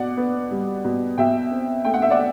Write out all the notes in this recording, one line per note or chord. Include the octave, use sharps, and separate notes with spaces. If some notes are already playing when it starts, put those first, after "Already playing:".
Already playing: B2 D5 F#5
B3
G3
B2
B2 E5 G5
C4
A3 G5
F#5
E5
D5 F#5